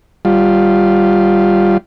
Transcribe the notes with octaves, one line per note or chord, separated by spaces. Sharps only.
G3 F4